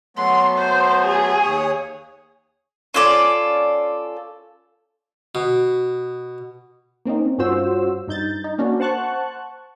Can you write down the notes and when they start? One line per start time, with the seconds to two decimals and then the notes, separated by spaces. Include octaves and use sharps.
0.17 F#3 A3 B3 C6
0.58 C5
1.05 G#4
1.42 D#2 C#5 D#6
2.94 C#4 F4 A4 D5
5.35 B2
7.05 A#3 C4 C#4 D#4
7.38 G2 C#4 F4 F#4 C5 E6
8.08 G2 D#4 G6 A6
8.44 D#4
8.58 A#3 C#4 D4 F#4
8.80 C5 F#5 A5 C#6 F#6